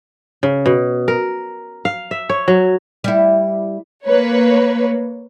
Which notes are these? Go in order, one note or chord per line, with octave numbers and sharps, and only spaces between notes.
C#3
B2
A#4
F5
E5
C#5
F#3
G3 E4
A#3 B4 C#5